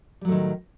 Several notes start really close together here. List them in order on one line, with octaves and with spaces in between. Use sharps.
G3 F#3 A2 D#3